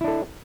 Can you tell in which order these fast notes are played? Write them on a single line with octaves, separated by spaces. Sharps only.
E4 D4 A4